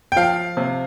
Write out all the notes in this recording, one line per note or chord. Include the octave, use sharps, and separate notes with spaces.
G5
F3 F5
C3